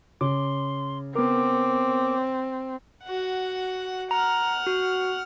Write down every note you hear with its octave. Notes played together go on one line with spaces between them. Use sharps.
C#3 C6 D6
B3 C4 A#4 D6
F#4 F#5
F#5 A#5 F6
F#4